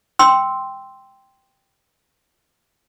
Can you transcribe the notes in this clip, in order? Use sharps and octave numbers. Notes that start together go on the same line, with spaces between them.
G5 C6 E6